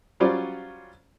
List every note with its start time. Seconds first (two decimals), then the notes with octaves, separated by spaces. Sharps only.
0.20 F#3 G3 C#4 F4 C5 D5